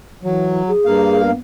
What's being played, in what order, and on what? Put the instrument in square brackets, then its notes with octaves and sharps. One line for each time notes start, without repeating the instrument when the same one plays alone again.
[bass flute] E3 [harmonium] F#3
[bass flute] G#4
[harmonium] G2 A#3 F5
[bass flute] B3